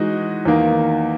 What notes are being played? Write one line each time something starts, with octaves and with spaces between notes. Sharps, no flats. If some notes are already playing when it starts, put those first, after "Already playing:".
Already playing: E3 G#3 D#4 F#4
E2 D#3 A#3